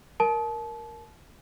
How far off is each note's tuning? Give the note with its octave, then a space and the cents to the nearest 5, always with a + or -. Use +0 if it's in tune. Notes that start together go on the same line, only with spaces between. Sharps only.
A#4 +0 A5 -30